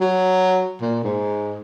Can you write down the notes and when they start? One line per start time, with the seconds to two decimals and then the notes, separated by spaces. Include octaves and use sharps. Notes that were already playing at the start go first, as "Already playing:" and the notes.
0.01 F#3
0.82 A#2
1.04 G#2